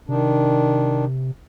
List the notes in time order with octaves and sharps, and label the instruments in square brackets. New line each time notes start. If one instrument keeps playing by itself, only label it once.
[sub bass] C3 [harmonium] D#3 D4